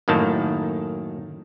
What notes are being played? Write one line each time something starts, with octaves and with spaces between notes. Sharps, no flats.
F#2 A2 D#3 A#3 A5